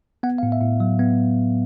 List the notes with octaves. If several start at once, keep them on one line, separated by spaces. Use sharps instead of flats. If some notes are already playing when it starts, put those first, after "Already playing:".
B3 F#5
F5
A2
E5
A2
F#3
B3